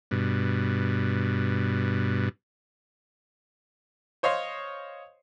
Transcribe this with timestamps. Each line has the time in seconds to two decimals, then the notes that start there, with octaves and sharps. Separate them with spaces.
0.11 G2 B2
4.23 C5 C#5 D#5 F5 C6